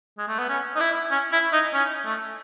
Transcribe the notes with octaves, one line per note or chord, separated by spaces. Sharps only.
G#3
A3
B3
C#4
D#4
E4
C#4
E4
D#4
C#4
A3